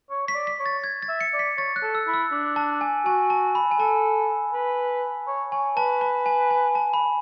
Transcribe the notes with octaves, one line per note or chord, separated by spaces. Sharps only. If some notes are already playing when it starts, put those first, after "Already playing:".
C#5
C#5 B6
D5
B6
C#5
A6
G#6
A6
E5
C#7
D5
B6
C#5 A6
F#6
A4
E6
E4
E6
D4
A5
G#5
F#4 G#5
A5
B5
G#5
A4 A5
B4
C#5
C#5 G#5
B4 A5
A5
G#5
G#5
A5
B5